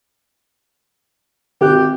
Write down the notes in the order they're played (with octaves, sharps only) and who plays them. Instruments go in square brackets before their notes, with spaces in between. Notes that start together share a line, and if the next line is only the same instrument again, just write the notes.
[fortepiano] G#1 F#4 F#6 [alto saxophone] G4